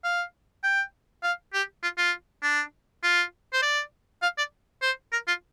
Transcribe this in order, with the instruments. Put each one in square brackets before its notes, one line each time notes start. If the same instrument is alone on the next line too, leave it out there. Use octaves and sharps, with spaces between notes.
[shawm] F5
G5
F5
G4
F4
F4
D4
F4
C5
D5
F5
D5
C5
A#4
F4